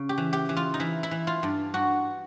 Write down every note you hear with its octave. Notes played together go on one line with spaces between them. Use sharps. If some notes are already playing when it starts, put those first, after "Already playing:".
Already playing: C#3
G4
E3
G4
E3
F4
D#4
E3 E4
E4
E3
F4
G2
G2 F#4